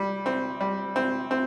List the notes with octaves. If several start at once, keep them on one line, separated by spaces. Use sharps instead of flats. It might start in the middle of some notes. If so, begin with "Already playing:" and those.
Already playing: G3
C4
G3
C4
C4